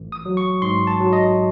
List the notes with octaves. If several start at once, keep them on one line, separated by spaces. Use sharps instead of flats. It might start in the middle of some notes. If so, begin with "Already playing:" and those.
Already playing: A1
D#6
F#3
C#6
G#2 C6
A5
F#3
D#5